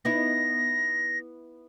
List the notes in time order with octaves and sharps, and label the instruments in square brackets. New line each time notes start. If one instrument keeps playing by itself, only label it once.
[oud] B3 D#4 E4 [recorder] A#6